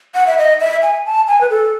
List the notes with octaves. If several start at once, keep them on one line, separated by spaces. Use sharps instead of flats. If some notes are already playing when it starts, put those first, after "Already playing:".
F#5
E5
D#5
E5
G#5
A5
G#5
B4
A4